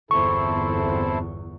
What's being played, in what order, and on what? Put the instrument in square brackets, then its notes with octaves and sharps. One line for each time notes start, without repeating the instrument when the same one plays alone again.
[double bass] G1 E2 [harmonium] C4 E4 A4 [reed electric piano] C#6